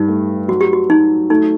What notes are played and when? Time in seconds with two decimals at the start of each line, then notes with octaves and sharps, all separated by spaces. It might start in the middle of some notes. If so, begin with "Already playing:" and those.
Already playing: G2 D#4
0.08 A3
0.48 F#3 F#4
0.61 G4
0.73 F#4
0.89 F#3 D#4
1.30 A3 D#4